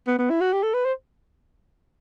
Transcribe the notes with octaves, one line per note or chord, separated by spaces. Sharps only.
B3
B3
E4
F#4
G4
A4
B4
C5